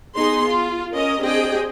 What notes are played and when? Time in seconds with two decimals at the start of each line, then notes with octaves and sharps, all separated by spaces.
0.16 B3 D#4 G#4 C6
0.46 F4
0.93 C#4 A#4 D#5
1.21 C4 D4 G4 G#4 D#5 G5